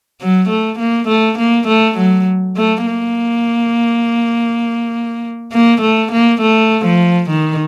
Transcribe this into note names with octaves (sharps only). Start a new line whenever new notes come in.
F#3
A3
A#3
A3
A#3
A3
F#3
A3
A#3
A#3
A3
A#3
A3
F3
D#3